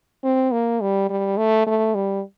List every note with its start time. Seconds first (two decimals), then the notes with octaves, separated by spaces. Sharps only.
0.24 C4
0.52 A#3
0.81 G3
1.10 G3
1.37 A3
1.67 A3
1.95 G3